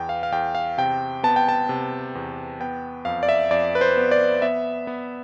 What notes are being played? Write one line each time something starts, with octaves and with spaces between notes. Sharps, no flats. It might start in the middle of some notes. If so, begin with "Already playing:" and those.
Already playing: E2 B3 G5
F5
F5
E2 G5
F5
C3 G5
B3 A5
G5
A5
C3
E2
B3 G5
F2 F5
D5
E5
F2 D5
B4
C5
B3
D5
B3 E5
B3